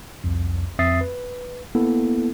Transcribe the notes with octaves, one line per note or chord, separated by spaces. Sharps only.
C2 F2
F2 C4 E5 D#6 A6 C7
B4
A#3 B3 E4 A4